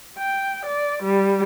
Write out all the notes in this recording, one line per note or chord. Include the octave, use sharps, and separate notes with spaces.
G5
D5
G3